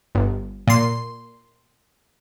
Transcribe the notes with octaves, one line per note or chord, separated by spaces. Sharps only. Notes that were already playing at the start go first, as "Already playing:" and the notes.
G1
A#2 C6